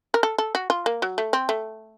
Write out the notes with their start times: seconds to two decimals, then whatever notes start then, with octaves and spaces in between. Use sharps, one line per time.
0.14 A#4
0.23 A4
0.38 A4
0.55 F#4
0.70 F4
0.86 A#3
1.02 F#3
1.18 A3
1.33 C4
1.49 A3